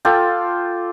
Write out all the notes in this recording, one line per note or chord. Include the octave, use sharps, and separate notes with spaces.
F4 A4 D5 G5